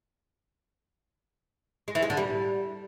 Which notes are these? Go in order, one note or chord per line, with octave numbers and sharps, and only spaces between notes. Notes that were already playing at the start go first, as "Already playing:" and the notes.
G#3
E3
G#3
D3
G3